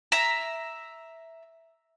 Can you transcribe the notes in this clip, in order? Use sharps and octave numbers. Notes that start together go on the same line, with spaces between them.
E5 A#5